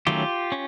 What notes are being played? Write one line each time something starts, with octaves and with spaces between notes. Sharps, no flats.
D#3 F#3 A3 C#4 F4 G4
C#4